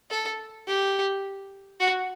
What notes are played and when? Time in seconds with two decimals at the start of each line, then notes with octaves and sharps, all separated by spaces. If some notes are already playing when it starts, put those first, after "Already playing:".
0.11 A4
0.68 G4
1.80 F#4